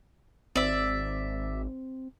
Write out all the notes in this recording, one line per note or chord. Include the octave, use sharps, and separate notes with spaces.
G#1 C4 D5 E5